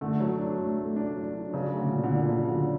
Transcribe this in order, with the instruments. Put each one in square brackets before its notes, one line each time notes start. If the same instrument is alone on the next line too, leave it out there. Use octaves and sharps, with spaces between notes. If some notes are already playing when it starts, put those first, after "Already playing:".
[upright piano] D3 [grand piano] A3
[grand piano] F#3
D4
A3
A3
D4
F#3
D4
[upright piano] C#3 [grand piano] F#3
[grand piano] A3
[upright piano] D3
[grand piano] A#2
[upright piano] D3
[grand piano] A#2
[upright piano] C#3 [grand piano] D4
[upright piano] D3 [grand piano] F#3